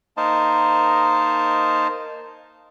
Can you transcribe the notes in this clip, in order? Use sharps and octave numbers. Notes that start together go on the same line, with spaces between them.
A#3 D#4 A#4 C5 D#5 A5